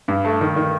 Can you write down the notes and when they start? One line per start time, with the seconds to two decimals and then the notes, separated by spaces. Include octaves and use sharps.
0.08 G2
0.25 A3
0.41 D#3
0.56 D#3